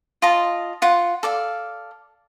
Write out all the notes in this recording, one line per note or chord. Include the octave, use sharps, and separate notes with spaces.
F4 D#5 A5
F4 F#5
A4 D5 F5